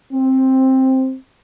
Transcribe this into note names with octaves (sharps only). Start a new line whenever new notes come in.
C4